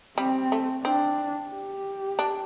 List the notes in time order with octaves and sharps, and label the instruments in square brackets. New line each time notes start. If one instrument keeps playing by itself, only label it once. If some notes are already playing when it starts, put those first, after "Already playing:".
[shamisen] G3 [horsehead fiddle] C4
[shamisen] A3
[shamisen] C4 [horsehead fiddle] D4
[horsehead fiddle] G4
[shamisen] D4